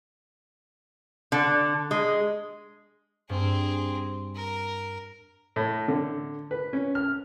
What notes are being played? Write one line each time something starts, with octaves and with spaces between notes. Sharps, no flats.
D3
G#3
G2 C4 G#4
A#4
A2
D3
B4
C#4
F6